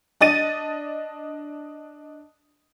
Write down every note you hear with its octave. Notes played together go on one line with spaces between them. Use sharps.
D4 D#5 A6 D#7